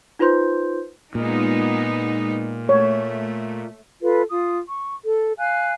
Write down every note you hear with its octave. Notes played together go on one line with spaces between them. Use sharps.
D#4 F4 B4 C5 C6 G6
A#2 G#3 B3 D#4
A3 C#5
F4 A4 B4
F4 D#6
C#6
A4
F5 G#5 F#6